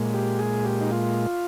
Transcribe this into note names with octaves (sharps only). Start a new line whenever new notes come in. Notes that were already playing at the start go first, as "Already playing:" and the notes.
Already playing: A#2 G#3
G4
G#4
G4
D#4
F4